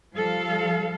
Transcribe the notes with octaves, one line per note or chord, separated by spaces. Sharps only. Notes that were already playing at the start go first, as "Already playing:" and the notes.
F3 G3 A4 F5